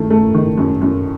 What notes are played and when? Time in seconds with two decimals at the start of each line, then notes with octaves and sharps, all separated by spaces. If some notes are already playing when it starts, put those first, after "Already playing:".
Already playing: D#3 A3
0.10 A3
0.34 D#3
0.58 F#2
0.81 F#2